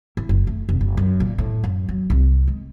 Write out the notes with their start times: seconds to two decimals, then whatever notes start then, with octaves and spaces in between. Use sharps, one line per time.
0.17 E4
0.29 F#1
0.47 A3
0.69 F1
0.81 F#1
0.97 F#2
1.20 A#2
1.38 A2
1.64 F#2
1.89 F#3
2.10 C2
2.47 G#3